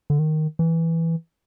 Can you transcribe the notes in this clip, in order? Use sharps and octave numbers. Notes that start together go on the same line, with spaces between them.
D3
D#3
E3